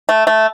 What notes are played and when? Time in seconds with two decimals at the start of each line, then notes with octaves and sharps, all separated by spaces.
0.09 A3
0.27 A3